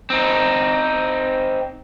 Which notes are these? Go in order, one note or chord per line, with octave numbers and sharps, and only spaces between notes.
C4 D#4